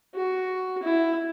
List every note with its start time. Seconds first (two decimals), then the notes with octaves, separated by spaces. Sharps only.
0.15 F#4
0.83 E4